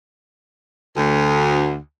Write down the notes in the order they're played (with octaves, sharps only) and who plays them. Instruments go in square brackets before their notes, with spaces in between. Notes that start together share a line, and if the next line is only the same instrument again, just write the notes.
[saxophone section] D2